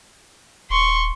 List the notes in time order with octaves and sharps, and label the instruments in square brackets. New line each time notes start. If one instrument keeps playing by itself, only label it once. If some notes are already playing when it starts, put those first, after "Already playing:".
[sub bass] D#1 [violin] C6 C#6